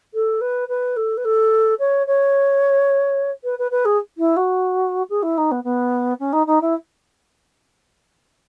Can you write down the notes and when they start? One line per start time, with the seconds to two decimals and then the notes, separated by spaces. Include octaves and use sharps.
0.14 A4
0.41 B4
0.69 B4
0.97 A4
1.17 B4
1.25 A4
1.80 C#5
2.07 C#5
3.44 B4
3.59 B4
3.71 B4
3.85 G#4
4.18 E4
4.37 F#4
5.10 G#4
5.23 E4
5.38 D#4
5.51 B3
5.64 B3
6.20 C#4
6.33 D#4
6.47 D#4
6.61 E4